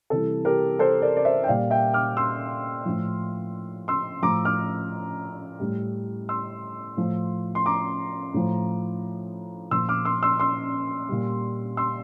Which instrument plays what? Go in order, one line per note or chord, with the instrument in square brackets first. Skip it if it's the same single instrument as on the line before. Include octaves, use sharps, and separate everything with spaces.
[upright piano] C3 E3 G3 A4
G4 A#4
A4 C5
A#4 D5
D5
C5 E5
G5
A#2 G3 D5 F5
E5 G5
D6 F6
C6 E6
A2 F3
C6 E6
A2 F3 A#5 D6
D6 F6
A2 G3
C6 E6
A2 F3
C6
A#5 D6
A2 F3
A#2 F3 C6 E6
D6 F6
C6 E6
C6 E6
C6 E6
A#2 G3
C6 E6